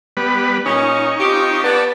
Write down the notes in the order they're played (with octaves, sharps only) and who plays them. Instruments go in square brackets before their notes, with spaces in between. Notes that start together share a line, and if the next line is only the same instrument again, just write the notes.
[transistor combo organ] G3 B3 B4
[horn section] A#2 C#4 [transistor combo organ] D#4 C#6
[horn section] C4 F4 G4
[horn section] B3 [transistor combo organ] D5 A5